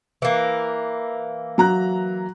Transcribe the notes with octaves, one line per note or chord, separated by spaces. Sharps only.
E3 A#3
F#3 A#5 F#6